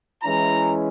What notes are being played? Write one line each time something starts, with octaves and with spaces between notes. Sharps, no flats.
E3 G#3 C#4 E4 A#5